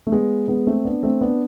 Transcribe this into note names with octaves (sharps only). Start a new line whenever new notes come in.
A3
G#3 B3
G#3 B3
A3 C4
B3 D4
A3 C4
B3 D4